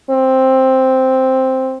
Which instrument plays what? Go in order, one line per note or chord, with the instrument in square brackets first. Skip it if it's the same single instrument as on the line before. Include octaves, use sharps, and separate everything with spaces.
[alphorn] C4